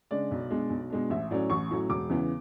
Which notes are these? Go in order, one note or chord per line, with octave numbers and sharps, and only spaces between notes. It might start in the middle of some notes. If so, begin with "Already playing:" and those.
C#3 G#3 D4 D5
B1
B2 G#3 D4
B1
B2 G#3 D4
A1 E5
A2 F#3 C#4 D5
A1 C#6
A2 F#3 C#4
E1 D6
E2 C#3 E3 B3